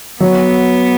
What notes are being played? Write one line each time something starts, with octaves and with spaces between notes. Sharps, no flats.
F#3 B3